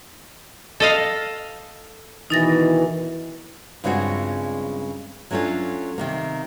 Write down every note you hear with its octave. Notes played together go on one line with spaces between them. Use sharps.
A4 D#5 F5
B2 D#3 E3 D#4 A6 A#6
G2 C#3 G#3 C4 F4 F#4
F#3 A3 C#4 D4 F4
C3 D#3 A#3